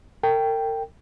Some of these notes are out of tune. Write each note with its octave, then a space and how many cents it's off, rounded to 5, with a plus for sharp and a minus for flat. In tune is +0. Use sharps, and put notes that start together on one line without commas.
A#4 -40 G5 +0